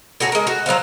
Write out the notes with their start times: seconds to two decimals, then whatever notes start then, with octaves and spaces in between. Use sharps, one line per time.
0.20 A2 F#4 G#4 A#5
0.32 G#3 A#4
0.47 F#4
0.66 F#3 B3 C5 F5